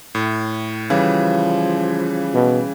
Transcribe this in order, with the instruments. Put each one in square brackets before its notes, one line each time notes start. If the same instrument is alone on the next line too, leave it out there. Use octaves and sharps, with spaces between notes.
[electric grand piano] A2
[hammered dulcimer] C#3 [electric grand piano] E3 G3 [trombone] F3
[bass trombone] B2